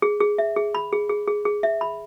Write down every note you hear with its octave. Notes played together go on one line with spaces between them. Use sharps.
G#4
G#4
E5
G#4
B5
G#4
G#4
G#4
G#4
E5
B5